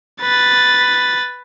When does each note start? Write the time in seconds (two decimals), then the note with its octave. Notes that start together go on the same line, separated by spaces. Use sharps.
0.22 B4 A6